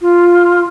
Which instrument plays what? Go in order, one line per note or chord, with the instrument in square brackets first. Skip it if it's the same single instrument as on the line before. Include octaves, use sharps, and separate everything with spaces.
[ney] F4